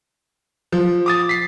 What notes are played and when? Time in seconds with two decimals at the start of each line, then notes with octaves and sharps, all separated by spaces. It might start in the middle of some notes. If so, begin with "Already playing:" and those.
0.72 F3
1.06 D6 D#6 A6
1.29 B6 C7